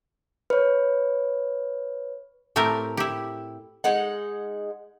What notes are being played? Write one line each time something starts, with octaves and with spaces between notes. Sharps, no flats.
B4 C#5
A2 A3 C4 G4 A#4
E4 G4
G#3 D#4 F#5